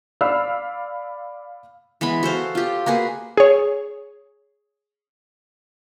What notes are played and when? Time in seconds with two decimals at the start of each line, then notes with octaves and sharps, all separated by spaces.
0.21 D5 F5 B5 E6 F6 C7
2.01 E3 G#3 B3 B5
2.23 F#4 A4 C5 F5
2.55 F4 G4
2.86 A#3 F#4 G#4 B4
3.37 G#4 C#5